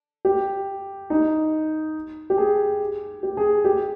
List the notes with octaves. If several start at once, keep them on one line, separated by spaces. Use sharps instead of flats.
G4
D#4
G4
G#4
G4
G#4
G4